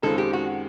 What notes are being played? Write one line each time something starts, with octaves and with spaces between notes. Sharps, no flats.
F#2 D#3 G#3 C4 F4 A4
G4
F#4